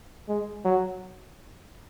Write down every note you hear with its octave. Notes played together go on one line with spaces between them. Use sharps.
G#3
F#3